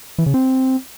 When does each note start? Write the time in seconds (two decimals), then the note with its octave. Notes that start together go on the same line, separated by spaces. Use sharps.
0.18 E3
0.26 C#3
0.34 C4